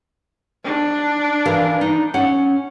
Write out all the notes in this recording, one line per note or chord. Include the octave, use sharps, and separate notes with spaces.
D4
E3 A#4 F5
D#4
C#4 F#5